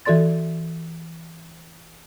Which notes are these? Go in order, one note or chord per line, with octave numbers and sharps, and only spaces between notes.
E3 F#4 A4 D5 C6 A6